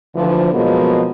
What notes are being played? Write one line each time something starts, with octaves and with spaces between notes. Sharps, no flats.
D2 D3 E3 F3
B2 F3 F#3 G#3 A#3 B3